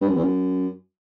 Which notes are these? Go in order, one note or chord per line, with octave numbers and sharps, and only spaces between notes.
G2
F#2
E2
F#2